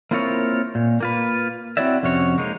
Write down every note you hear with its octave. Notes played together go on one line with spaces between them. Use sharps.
A#3 C4 E4 F4 A#4 C#5
A#2
A#3 F4 B4
C4 E4 F#4 C#5 D5 E5
F2 C3 C#4 F#4 C#5
G#3 A#3 D#4